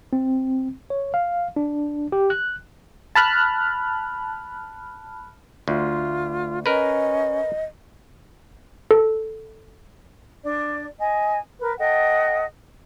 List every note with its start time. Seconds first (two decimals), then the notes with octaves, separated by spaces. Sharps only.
0.13 C4
0.90 C#5
1.14 F5
1.56 D4
2.12 G4
2.30 F#6
3.15 A5 B5 F6 F#6
5.68 D2 F4
6.66 C#4 A#4 B4 D#5
8.91 A4
10.43 D4 D5
10.99 D#5 G#5
11.59 A#4 B4
11.78 A4 D#5 F#5 G5